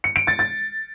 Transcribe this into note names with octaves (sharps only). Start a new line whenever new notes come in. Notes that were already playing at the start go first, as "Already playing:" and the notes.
C#7
D7
A6
A6